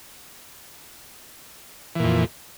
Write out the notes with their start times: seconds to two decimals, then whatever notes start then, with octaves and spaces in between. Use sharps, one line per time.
1.95 E3
2.00 A#2
2.04 F2